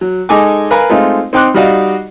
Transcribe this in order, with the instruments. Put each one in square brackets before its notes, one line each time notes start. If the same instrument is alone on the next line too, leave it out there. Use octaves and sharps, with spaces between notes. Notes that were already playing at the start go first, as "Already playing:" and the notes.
[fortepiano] F#3
G#3 D#4 A4 D#5 G#5 D6
A#4 B4 F5 G#5 A#5 B5
G#3 A3 C4 D#4 F4
C4 D#4 G5 C6 D6 F#6
G3 D#4 F#4 D5 D#5 F5